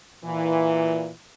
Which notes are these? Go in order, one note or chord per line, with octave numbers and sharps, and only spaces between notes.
A#2 E3